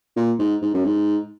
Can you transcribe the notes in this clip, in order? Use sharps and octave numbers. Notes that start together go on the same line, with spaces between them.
A#2
G#2
G#2
F#2
G#2